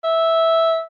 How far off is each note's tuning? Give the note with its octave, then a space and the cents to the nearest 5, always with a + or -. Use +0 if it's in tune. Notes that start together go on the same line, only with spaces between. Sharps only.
E5 -10